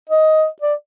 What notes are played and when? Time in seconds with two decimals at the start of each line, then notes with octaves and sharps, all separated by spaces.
0.09 D#5
0.62 D5